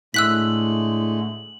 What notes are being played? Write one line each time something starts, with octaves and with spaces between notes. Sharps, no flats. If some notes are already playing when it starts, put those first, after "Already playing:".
A2 D3 G#3 A3 E6 F#6 B6 F#7